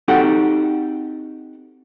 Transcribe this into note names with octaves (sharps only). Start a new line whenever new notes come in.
C4 D#4 F#4 G4 A4 F#5